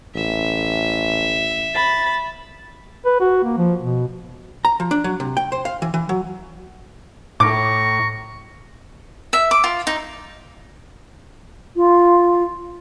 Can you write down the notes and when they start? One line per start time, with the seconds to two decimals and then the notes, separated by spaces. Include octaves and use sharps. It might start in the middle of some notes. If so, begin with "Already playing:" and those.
0.15 A1 E5
1.75 B5 A6
3.05 B4
3.20 F#4
3.44 A#3
3.57 F3
3.81 B2
4.65 A#5
4.80 F3
4.91 D4
5.04 F#3
5.20 C3
5.37 G5
5.52 C5
5.65 F5
5.82 E3
5.94 E3
6.09 F#3
7.40 A2 A#5 C#6 D6
9.33 E5
9.51 D6
9.64 F4
9.87 D#4
11.76 F4